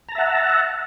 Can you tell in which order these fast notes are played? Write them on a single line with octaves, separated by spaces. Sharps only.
A#5 A5 E5 F#5